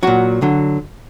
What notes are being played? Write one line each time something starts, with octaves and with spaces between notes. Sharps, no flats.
A#2 F#3 F#4
D3 F#3